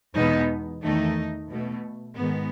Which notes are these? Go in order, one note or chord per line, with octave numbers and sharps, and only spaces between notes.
E2 B2 G#3 B3 D#4
E2 D#3 A3 D#4
B2 A3
G#2 D#3 G#3 B3